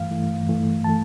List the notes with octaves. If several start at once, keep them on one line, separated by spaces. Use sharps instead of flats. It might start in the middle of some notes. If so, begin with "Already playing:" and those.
Already playing: G2 E3 A3 F5
G2 E3 A3
G2 E3 A3
E3 A3 A5